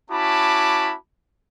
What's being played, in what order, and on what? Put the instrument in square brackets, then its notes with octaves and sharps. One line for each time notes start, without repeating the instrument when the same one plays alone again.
[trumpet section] C#4 E4 F#4 A5 B5 D6